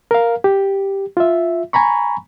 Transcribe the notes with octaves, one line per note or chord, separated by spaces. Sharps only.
A#4 F5
G4
F4 E5
G#5 A#5 B5 C#6